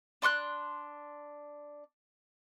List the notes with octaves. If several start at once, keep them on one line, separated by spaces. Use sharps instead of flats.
D4 C6 C#6 F#6